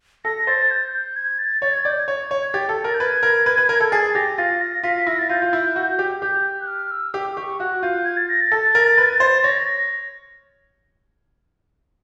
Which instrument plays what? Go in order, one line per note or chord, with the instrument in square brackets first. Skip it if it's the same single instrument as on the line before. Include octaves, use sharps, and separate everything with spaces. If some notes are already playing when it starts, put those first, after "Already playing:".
[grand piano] A4 [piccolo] A#6
[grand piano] C5 [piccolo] A6
[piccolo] G6
G6
G#6
A6
[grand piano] C#5 [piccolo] A6
[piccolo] G#6
[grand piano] D5 [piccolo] G6
[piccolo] G#6
[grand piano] C#5
C#5
[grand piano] G4 [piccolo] A6
[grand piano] A4
[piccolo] A6
[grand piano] A#4
[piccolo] G6
[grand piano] B4 [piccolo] G#6
[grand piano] A#4
B4
B4
A#4
A4
[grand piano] G#4 [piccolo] A6
[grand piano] G4 [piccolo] A#6
[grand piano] F4 [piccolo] A6
[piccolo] A#6
[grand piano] F4 [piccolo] B6
[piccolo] B6
[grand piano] E4 [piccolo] A#6
[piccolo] A6
[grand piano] F4 [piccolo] G6
[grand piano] F4
E4
F#4
G4
[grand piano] G4 [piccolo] G6
[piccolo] F#6
F6
E6
[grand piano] G4 [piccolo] D6
[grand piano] G4 [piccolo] C#6
[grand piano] F#4 [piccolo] F#6
[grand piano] F4 [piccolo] G6
[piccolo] G#6
A6
A#6
A6
[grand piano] A4
A#4
B4
C5
[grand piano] C#5 [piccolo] A#6
[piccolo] A#6